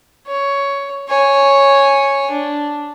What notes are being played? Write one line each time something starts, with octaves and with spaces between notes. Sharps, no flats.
C#5
C#5 G#5
D4